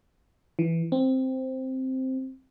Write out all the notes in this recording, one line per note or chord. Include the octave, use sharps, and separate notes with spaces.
E3
C4